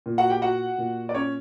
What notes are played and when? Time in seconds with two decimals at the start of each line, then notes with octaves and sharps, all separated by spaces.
0.06 A#2
0.18 F#4 F#5
0.30 G4 G5
0.42 F#4 F#5
0.78 A#2
1.09 D5
1.15 C#4 C#5